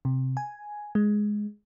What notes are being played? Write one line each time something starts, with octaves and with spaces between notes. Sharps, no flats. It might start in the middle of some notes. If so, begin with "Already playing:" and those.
C3
G#5
G#3